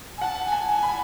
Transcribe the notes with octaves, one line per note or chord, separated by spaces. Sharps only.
G#5
F#5 A5
G#5
A5
G#5
B5